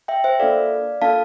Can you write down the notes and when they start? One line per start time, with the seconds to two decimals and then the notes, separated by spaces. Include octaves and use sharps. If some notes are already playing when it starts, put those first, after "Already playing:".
0.08 E5 G5
0.24 C5 E5
0.40 A#3 D4 F4 A4 D5 F5
1.02 A#3 D4 F4 A4 F5 A5